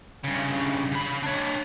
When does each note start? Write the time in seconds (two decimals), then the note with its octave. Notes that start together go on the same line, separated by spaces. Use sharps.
0.24 G2 C#3
0.92 C#3 B5
1.23 D4 C#5